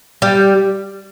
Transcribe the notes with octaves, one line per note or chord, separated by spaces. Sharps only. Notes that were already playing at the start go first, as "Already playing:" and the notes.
G3